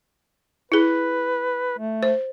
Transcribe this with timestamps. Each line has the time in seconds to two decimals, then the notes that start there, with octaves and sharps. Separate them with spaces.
0.72 E4 G#4 B4
1.79 A3
2.03 C5